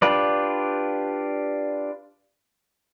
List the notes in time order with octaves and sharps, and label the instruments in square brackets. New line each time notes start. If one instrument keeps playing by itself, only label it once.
[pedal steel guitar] D4 F4 G4 B4 D5